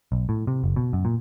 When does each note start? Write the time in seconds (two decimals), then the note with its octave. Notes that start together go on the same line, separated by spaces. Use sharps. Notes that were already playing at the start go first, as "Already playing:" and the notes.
0.12 B1
0.29 A2
0.47 C3
0.64 F#1
0.76 B2
0.93 F#2
1.05 A#2